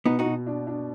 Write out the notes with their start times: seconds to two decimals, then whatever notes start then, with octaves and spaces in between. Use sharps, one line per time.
0.06 B2 B3 D#4
0.19 D#4 F#4
0.26 B2
0.47 D4
0.67 D4